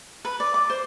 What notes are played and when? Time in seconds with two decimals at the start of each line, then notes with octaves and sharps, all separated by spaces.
0.25 B4
0.40 D5
0.54 D6
0.70 C5